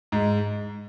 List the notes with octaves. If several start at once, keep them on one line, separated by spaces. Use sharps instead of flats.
G#2 G#3